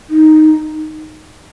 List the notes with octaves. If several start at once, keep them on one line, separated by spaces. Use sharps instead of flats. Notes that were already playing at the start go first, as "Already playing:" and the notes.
D#4